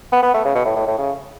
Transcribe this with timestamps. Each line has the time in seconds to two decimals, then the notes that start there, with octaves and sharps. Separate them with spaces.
0.12 B3
0.22 B3
0.34 A3
0.45 C#3
0.55 B2
0.65 A2
0.76 A2
0.87 A2
0.98 C#3